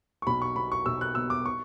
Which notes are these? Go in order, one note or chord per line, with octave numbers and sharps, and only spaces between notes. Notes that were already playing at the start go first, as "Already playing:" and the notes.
C#6
B1 B5
C#6
B2 B5
C#6
B1 E6
F#6
B2 E6
D6
C#6